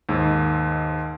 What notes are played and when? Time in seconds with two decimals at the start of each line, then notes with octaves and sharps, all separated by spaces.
0.09 D#2 G#2 E6